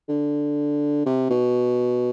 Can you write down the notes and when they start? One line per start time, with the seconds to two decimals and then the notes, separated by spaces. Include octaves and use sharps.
0.09 D3
1.06 C3
1.30 B2